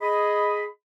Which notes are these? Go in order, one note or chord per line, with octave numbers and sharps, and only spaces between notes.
G#4 D#5 B5